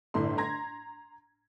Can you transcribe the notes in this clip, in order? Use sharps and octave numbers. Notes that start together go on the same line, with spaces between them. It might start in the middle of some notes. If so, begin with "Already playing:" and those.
G1 A2 D4 C6
A#5 C6 G#6 A#6